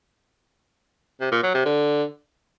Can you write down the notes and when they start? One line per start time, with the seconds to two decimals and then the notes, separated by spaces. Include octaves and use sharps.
1.21 C3
1.32 A#2
1.43 F#3
1.54 C3
1.65 D3